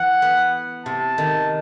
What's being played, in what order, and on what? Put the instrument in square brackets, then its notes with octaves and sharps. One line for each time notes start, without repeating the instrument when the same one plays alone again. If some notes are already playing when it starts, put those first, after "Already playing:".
Already playing: [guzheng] E3 [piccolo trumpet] F#5
[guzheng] B3
[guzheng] C3 [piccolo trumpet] A5
[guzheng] D#3